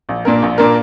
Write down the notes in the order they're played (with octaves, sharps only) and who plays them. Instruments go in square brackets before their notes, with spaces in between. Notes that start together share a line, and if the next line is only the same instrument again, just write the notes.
[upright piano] A#1
A#2 A#3 D4 A#4
A#1
A#2 A#3 D4 A#4